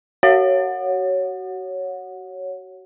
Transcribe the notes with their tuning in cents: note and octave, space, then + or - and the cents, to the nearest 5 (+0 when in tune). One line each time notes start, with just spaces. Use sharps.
F#4 +30 C#5 +0 F#5 -20